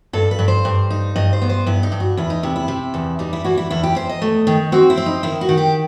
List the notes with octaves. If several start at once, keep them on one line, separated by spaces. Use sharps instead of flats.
G2 A4
B4
G2
C5
G2
D#4
G2 D#5
C5
B3
C5
G2 E4
D#4
G2
F#4
E2 E4
D#4
C3 E4
E4
C3
E2
G3 D#4
E4
E3 F#4
E4
E2 E4
G4
E2 C5
D#5
A3
D#3
C4 F#4
E4
C4
D#4
D#3 E4
F#4
D#3
G4